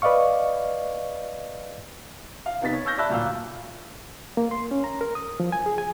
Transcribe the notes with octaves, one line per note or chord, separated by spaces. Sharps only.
B4 D5 D#5 F5 C#6
F5
C3 B3 D#4 A6 B6
C#5
C#6 E6 F6 G6 A#6
D5 E5 A5 B5 E6 F#6
D1 A#2 F#3 F4 F5 E6
A#3
C6
C#4
A#5
A#4
D#6
F3
G#5
G#4
G#5